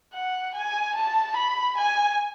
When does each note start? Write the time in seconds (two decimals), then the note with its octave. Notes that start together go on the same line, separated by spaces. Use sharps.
0.14 F#5
0.55 G#5
0.95 A5
1.36 B5
1.77 G#5